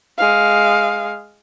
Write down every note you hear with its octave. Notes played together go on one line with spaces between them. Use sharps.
G#3 F5